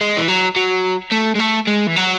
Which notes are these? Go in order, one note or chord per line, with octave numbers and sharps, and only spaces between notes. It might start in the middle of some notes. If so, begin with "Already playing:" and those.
G#3
E3
F#3
F#3
A3
G#3
A3
G#3
E3
F#3